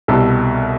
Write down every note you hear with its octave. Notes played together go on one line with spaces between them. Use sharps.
C2 B2 G3 A4